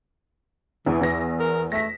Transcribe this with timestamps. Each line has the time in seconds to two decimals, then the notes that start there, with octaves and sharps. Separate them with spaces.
0.86 E2 E3
1.01 E2 A#6
1.40 A#4
1.72 A3 A#6 B6